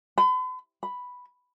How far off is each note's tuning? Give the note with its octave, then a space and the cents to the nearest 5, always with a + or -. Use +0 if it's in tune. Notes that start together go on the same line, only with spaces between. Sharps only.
B5 +45
B5 +0